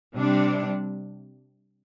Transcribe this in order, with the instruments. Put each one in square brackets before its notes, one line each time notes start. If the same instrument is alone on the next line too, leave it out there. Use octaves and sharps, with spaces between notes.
[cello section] C3 G3 D4